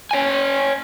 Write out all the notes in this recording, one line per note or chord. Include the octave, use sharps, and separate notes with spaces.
C#5 D#5 G5 G#5